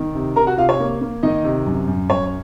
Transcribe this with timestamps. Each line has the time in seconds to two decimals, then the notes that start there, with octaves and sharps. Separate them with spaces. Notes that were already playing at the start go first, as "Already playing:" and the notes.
Already playing: D#3
0.15 C3
0.36 C3 A#4 A#5
0.47 F#4 F#5
0.58 C3 F4 F5
0.69 C#5
0.80 A#3
1.01 A#3
1.23 D#3 D#4 D#5
1.44 C3
1.66 F#2
1.88 F#2
2.10 F#2 C#5